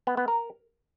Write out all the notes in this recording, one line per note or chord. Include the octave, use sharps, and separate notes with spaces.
B3
B3
A#4